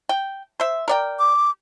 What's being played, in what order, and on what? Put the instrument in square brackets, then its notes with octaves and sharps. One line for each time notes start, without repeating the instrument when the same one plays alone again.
[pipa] G5
C5 E5
A#4 D5 G5
[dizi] D6